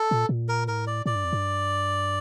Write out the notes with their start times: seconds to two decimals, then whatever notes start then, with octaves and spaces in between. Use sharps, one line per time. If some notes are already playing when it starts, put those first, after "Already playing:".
Already playing: A4
0.11 A#2
0.29 A#2
0.48 A#4
0.68 A2 A#4
0.87 D5
1.06 A2 D5
1.15 G2
1.24 F2
1.33 G2